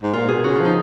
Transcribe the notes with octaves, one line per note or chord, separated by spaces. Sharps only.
G#2
A#2 F4
B2 G#4
C#3 F#4
F4
F3 D#4